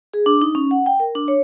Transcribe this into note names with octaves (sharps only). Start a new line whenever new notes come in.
G#4
D4
D#4
C#4
F#5
G5
A#4
D4
C#5